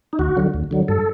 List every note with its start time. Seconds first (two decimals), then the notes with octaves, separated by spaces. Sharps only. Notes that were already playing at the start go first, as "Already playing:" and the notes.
0.13 D#4
0.19 D2 F#4
0.36 D3 F#3
0.54 D2
0.71 D3 F#3
0.88 G2 A4